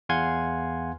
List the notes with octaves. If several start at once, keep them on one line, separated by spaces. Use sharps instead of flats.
E2 F5 F#5 G#5 C6 G#6